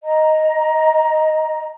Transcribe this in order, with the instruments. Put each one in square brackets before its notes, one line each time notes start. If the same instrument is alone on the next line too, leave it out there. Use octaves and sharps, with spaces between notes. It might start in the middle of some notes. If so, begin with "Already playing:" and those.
[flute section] D#5 A#5